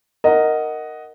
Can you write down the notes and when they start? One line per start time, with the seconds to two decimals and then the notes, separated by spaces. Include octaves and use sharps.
0.24 A#4 D#5 F#5